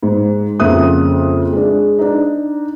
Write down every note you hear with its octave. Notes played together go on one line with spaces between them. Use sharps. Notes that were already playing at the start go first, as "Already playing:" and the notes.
G#2
F2 C#3 A#3 E5 D#6 F#6
G#3 D4
D4 D#4